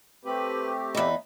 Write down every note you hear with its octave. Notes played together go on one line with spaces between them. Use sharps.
A3 C4 G4 B4
E2 D#4 B5